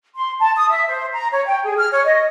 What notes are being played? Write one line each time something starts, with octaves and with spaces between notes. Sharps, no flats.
C6
A5
D#6
E5
C5
A#5
C#5
G5
G#4
F6
C#5
D#5